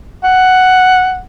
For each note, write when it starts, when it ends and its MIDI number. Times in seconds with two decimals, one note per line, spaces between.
0.24 1.20 78